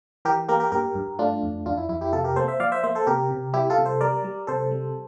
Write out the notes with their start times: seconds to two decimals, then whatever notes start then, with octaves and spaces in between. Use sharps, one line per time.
0.25 E3 G4 A#4
0.48 A#3 G4 A#4
0.60 G4 A#4
0.72 G2 G4 A#4
0.95 G2
1.19 A3 D4 F4
1.43 F2
1.66 F2 D4 F4
1.77 E4
1.89 F2 E4
2.01 E4 G4
2.13 C3 F4 A4
2.24 G4 A#4
2.36 A#3 A4 C5
2.48 C5 E5
2.60 F3 D5 F5
2.72 C5 E5
2.83 A#3 C5 E5
2.95 A4 C5
3.07 C3 G4 A#4
3.31 C3
3.53 G3 E4 G4
3.70 F4 A4
3.78 C3
3.85 A4 C5
4.01 G3 A#4 D5
4.24 G3
4.47 C3 A4 C5
4.71 G3